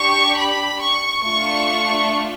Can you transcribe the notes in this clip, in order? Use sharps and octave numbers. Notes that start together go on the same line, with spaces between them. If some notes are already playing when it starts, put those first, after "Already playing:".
Already playing: D4 G4 C#6
B5
C#6
A3 D4 F4 C#6